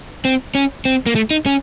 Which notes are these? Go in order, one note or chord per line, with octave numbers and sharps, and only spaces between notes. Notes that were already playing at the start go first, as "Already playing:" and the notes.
C4
C#4
C4
A#3
A3
D#4
C#4